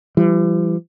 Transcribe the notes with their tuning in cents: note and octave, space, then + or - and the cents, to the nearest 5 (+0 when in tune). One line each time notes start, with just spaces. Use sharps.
E3 +45 G3 -5